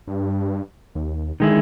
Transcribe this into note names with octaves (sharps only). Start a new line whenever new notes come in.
G2
D#2
D3 D#3 G#3 E4